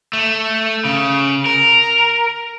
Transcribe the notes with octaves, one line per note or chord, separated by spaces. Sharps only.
A3
C#3
A#4